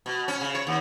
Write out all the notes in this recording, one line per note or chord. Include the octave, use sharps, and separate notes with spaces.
B2
C#4
C#3
C#5
D#2